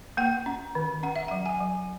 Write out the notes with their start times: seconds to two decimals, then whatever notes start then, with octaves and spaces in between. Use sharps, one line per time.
0.17 A#3 F#5
0.46 C#4
0.75 D#3
1.03 C#4 F#5
1.16 E5
1.28 F#5
1.31 F#3
1.46 G#5
1.60 F#3